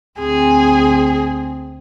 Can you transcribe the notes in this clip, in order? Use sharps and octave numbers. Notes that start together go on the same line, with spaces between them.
D2 C4 G#4